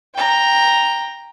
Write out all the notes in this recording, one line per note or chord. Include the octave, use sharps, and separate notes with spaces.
G5 A#5